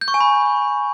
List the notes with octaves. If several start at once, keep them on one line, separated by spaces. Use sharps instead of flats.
G6
C#6
G#5
B5